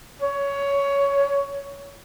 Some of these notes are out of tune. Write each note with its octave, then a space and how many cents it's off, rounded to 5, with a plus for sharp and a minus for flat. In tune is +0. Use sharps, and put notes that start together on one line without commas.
C#5 +15